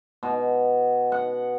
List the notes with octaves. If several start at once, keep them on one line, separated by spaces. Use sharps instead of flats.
B2
F#5